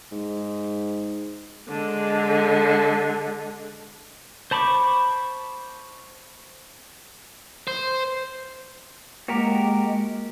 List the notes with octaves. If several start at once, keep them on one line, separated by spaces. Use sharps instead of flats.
G#2
D3 G#3
C5 A5 B5 C#6 D6
C5
G#3 A#3 F#4 G4 A#4